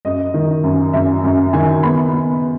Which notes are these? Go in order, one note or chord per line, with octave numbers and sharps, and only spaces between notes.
F#2 D#5
D#3
F#2
F#2 E5
F#2
D#3 G#5
B3 B5
B3